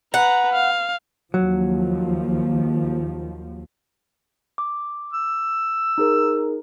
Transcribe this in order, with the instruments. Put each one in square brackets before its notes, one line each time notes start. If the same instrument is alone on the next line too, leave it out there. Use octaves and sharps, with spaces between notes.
[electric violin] B4 A#5 [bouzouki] F#5
[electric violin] F5
[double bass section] D#2 F3 [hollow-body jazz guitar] F#3
[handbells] D6
[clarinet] E6
[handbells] D#4 G#4 A#4